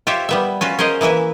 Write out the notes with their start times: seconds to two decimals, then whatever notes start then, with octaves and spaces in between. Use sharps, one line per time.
0.07 F4 G4 C5 C#5 E5
0.29 G3 B3 E5
0.61 C#4 F4 F#4 B4
0.79 C#4 G#4 A#4 C5 D#5
1.01 E3 A#3 E4 B4 E5